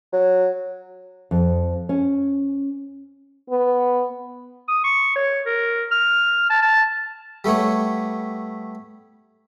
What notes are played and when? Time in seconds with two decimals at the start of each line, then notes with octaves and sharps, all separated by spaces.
0.12 F#3
1.31 F2
1.89 C#4
3.50 B3
4.68 D#6
4.84 C#6
5.16 C#5
5.46 A#4
5.91 F6
6.50 A5
6.62 A5
7.44 G3 A3 B3 C#5